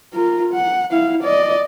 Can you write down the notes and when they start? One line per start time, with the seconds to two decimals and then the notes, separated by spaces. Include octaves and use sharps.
0.14 F4 A#4
0.53 F#5
0.91 E4 F5
1.23 D5 D#5